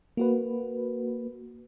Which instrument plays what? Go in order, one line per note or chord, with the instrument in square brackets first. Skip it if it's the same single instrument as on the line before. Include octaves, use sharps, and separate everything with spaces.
[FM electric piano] A#3 F#4 B4